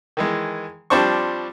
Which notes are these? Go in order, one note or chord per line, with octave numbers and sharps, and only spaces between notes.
D#3 E3 G#3
F3 G3 C4 D4 C5 C#6